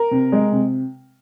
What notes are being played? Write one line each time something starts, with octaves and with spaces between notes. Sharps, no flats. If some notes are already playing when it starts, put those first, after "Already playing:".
Already playing: A#4
C3
G#3
C3